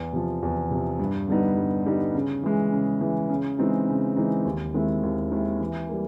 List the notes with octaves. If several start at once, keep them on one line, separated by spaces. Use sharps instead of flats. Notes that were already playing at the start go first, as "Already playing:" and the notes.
Already playing: E2
C3 F3
E2
C3 F3
G2
D3 G3 B3 D#4
G2
D3 G3 B3 D#4
C#3
E3 G#3
C#3
E3 G#3
C#3
E3 G#3 C4 D#4
C#3
E3 G#3 C4 D#4
D#2
D#3 G#3 C4 E4
D#2
D#3 G#3 C4 E4
E3
G3 A#3